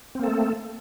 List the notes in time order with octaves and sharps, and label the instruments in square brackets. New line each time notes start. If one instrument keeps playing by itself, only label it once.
[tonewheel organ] C4
A#3
A4
A3